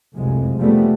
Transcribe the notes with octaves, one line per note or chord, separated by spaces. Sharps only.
F1 C2 F#2 G#3
C#3 F3 G3 A3 B3